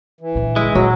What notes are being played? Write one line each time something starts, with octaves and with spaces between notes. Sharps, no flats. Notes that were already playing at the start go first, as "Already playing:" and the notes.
E3
A#2 D3
G#3 E4
F#2 A#2 F#3